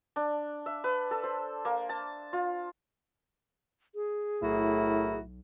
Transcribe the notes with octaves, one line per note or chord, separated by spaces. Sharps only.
D4
E5
B4
A4
C5
A#3
A5
F4
G#4
B1 A2 E4 F#4 A#4